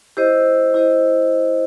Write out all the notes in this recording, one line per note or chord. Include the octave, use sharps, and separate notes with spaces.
E4 G4 C5 D#5
E4 G4 C5 D#5